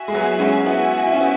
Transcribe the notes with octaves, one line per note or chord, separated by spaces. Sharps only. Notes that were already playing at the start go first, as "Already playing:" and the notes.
Already playing: F#4 E5 G#5
G#3
F#3 B3
E4
G#3 C#4
B3 E4 F#4 E5 G#5
E4
C#4
B3